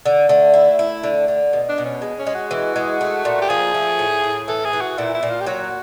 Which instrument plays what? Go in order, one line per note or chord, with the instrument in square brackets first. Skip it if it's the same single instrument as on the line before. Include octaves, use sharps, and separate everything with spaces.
[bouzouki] D3
[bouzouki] D3 [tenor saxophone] A3
[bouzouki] E4
E4
D3
D3
B2
[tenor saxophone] D4
[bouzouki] B2
[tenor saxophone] C#4
[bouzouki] G#3
[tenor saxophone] C#4
[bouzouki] G#3
[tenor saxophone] F#4
[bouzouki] E3
G#3
A3
A#2
[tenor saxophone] G4
[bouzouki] F3 [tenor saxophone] G#4
[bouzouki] A3
A2
A2
[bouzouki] E3 [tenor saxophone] A4
[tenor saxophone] G#4
[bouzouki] E3
[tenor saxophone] F#4
[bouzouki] A#2 [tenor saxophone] E4
[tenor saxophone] E4
[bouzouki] A#2
[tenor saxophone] F4
G4
[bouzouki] F#3 [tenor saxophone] F#4